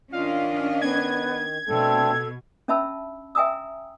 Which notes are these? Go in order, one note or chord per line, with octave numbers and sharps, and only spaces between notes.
D#3 C#4 D4 F4 D#5 F5
B3 G#6
B2 A3 C4 D4 A4
C#4 D4 E5 A5 B5 E6
E5 G5 G#5 A#5 D#6 E6